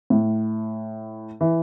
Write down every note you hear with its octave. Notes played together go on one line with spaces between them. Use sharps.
A2
E3